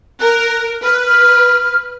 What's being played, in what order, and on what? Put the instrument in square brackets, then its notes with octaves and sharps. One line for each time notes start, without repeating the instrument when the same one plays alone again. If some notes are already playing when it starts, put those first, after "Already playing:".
[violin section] A#4 [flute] F#6
[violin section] B4 [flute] F6
[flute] F#6
F6